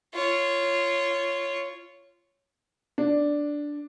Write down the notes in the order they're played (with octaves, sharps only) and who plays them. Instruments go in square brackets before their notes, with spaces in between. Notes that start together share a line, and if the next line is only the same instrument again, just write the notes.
[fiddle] F4 C#5
[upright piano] D4